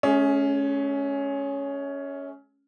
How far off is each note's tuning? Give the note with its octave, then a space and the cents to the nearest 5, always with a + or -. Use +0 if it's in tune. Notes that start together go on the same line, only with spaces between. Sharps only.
A3 -40 C#4 +10 G#4 +0